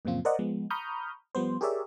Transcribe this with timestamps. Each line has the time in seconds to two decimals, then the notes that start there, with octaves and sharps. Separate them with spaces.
0.05 F#2 A#2 C#3 F3 C4 F4
0.25 A#4 C5 D5 D#5 F#5
0.39 F3 G#3 B3
0.70 A#5 B5 C#6 D#6 F6 G6
1.35 F3 G3 B3 C5
1.61 G4 G#4 A#4 C#5 D5 E5